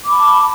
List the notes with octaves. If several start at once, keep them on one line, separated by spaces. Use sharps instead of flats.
A5 B5 D6